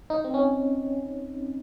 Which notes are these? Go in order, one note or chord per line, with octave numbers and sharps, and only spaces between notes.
D#4
C4
C#4